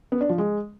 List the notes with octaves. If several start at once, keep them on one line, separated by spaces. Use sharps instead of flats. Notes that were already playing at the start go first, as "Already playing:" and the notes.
B3
D4
F3
G#3